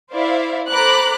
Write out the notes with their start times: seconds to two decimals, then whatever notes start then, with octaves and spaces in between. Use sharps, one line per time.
0.12 E4 C5 D5 E5 F5
0.68 A4 C5 A#5 B5 D6 F#6